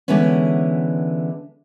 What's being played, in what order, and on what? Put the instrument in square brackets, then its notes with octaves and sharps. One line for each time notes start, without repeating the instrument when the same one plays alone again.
[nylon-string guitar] D3 E3 G#3 B3 C#4